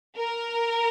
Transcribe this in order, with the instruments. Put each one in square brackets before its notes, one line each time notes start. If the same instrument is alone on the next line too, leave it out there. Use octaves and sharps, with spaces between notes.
[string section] A#4